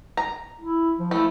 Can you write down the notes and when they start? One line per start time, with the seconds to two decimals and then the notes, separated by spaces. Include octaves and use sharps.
0.17 A#5
0.61 E4
0.99 F3
1.11 F3 A3 E4